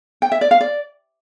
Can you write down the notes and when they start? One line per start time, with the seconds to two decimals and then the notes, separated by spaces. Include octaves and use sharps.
0.22 G5
0.32 E5
0.41 D5
0.51 F5
0.61 D5